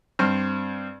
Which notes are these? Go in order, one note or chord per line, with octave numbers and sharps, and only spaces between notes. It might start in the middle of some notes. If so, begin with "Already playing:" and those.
G2 C4 F6